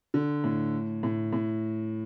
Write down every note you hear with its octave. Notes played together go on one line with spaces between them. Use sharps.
D3
A2
A2
A2